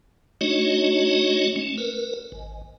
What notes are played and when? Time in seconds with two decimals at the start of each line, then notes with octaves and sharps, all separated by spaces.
0.41 A3 D4 D#4 F#4 C#5 D#5
1.56 A3 C#4
1.78 A#4 B4
2.32 G#1